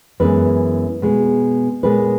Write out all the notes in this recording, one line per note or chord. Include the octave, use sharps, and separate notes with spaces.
F#2 E3 G#3 B3 B4
B2 G#3 B3
A#2 G#3 B3 B4